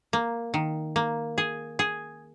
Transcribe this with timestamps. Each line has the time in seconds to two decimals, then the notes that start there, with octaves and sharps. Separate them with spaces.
0.13 A#3
0.54 D#3
0.96 A#3
1.38 G#4
1.79 G#4